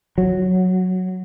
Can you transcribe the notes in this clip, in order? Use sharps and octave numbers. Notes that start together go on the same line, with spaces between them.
F#3